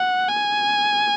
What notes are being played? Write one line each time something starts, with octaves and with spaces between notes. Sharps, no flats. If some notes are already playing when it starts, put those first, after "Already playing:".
Already playing: F#5
G#5